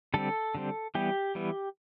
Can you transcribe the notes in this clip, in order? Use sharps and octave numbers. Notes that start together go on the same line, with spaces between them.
D3 G3 C4 A4
D3 G3 C4
E3 G3 B3 G4
E3 G3 B3